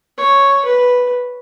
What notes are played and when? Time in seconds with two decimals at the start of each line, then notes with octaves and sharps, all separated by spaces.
0.17 C#5
0.65 B4